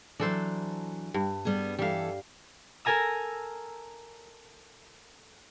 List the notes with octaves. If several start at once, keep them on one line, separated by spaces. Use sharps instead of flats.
E3 F#3 D4 A4 C5
G2
G3 B3 G#4
E3 G3 A4 F5
A4 A#4 G#5 A#5 E6